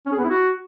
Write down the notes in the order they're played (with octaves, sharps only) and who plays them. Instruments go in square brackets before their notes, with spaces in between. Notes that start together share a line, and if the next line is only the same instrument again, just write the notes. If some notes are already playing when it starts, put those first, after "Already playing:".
[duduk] C#4
G#4
B3
E4
F#4